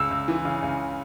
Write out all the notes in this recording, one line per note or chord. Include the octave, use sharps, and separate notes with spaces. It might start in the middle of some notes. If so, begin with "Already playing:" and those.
Already playing: C#2 E6
C#2
E3
C#3
C#2